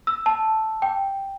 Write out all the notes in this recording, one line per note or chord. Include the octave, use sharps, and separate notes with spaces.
E6
A5
G5